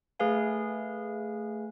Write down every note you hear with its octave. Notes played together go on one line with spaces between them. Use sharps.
A3 G#4 B4 F5 G#5